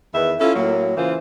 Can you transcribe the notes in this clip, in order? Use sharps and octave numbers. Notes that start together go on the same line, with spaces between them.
E2 D#3 B4 E5
C#4 E4 F4 A4
A2 F#3 A#3
C#3 E3 F4 C5